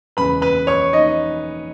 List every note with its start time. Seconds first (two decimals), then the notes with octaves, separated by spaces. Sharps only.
0.17 E1 E2 C#3 B4 B5
0.42 B4 B5
0.67 C#5 C#6
0.93 D#4 D#5